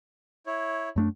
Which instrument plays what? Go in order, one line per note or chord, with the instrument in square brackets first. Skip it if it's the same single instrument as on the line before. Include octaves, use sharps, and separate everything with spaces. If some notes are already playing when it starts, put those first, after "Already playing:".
[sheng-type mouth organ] E4 C#5
[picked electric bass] F#2 A3 D4